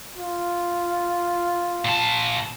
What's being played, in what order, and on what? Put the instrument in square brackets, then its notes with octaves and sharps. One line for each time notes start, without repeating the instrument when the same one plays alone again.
[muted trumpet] F4
[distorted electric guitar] A#2 A5